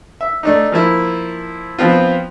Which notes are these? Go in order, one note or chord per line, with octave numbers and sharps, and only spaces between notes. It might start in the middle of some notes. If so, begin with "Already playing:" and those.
E5
A3 D4 D#4
F3 A#3 E4
F3 B3 C4 F4